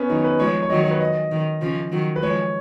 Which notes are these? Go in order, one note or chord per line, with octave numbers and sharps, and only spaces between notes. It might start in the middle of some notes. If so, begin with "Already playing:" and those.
Already playing: B3 C#4
D#3 F#3 D#4
B4
F3 G#3 C#5
C#5
D#3 F#3 D#5
C#5
B4
D#5
D#3
C#3 F3
D#3 F#3
B4
F3 G#3 C#5